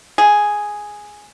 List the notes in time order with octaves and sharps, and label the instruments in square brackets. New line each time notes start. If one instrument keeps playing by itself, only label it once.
[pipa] G#4